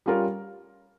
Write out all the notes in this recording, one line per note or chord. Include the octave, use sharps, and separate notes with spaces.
G3 C#4 F4 A#4